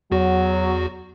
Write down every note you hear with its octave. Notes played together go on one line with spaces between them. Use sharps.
E2 F#3 F#4